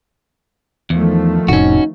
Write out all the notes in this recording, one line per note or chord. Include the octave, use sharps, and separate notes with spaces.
E2 D#3 F3 A3
F1 A2 C3 C#4 D#4 F#4